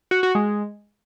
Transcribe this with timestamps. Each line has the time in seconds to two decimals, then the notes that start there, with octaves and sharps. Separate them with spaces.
0.11 F#4
0.23 F#4
0.35 G#3